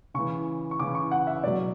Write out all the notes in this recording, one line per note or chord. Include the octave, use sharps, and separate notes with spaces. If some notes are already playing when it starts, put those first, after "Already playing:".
C#3 E3 C#6
C#6
C#3 E3 D6
C#6
F#5
E5
B2 F#3 D5